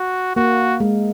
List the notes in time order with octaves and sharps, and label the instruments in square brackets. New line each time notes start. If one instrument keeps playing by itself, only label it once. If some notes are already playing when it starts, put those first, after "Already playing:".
Already playing: [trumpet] F#4
[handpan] A#3 [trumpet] F#4
[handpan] G#3